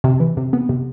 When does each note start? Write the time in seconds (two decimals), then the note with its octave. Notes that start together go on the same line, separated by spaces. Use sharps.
0.04 C3
0.20 E3
0.37 C3
0.53 B3
0.69 C3